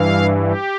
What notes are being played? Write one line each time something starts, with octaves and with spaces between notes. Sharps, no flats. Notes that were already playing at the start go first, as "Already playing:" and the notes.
Already playing: G2 E3 F5
G4